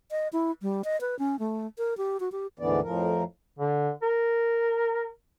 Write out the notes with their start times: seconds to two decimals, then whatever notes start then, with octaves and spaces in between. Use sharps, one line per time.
0.11 D#5
0.33 E4
0.62 G3
0.84 D#5
1.01 B4
1.19 C#4
1.39 A3
1.78 A#4
1.97 G4
2.20 F#4
2.32 G4
2.59 D2 G#2 D3 E3 B3 D5
2.83 F2 A2 F3 A#4
3.59 D3
4.02 A#4